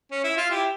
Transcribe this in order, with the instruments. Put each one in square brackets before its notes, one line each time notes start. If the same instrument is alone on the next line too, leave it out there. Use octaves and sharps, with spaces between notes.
[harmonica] C#4
E4
F4
E4 G4